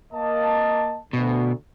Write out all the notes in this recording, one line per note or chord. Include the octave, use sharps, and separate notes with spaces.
A#3 D#5 A5
D2 B2